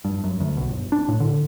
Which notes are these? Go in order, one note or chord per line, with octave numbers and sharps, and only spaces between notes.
G2
F#2
D2
B1
G1
D4
A2
D3